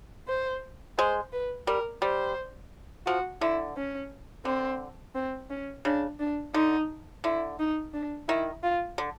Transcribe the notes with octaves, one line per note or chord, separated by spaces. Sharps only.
C5
G#3 C5
B4
G3 A#4
G3 C5
F3 F#4
D3 E4
C#4
D3 C4
C4
C#4
C#3 D4
D4
D3 D#4
D3 E4
D#4
D4
D#3 E4
F4
D3